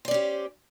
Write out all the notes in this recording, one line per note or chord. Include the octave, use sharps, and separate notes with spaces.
C#4 G4 C5 D5